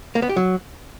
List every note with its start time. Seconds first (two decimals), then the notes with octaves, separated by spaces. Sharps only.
0.15 A#3
0.22 B3
0.29 G4
0.36 F#3